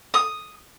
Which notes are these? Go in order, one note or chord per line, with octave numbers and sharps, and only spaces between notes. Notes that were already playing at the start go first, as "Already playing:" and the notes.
D#6